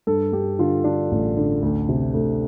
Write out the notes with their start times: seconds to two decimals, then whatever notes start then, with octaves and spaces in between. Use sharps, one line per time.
0.07 G2 A4
0.33 G2 G4
0.59 D3 F4
0.84 D3 D4
1.11 A1
1.37 D3
1.62 D2
1.89 C3
2.14 D2